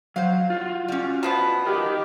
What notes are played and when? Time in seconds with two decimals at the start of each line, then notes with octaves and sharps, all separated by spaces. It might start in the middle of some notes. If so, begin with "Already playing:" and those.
0.16 F#3 C5 F5
0.50 F4 F#4
0.88 G3 C#4
1.23 B2 F3 B3
1.66 G4 A#4 D#5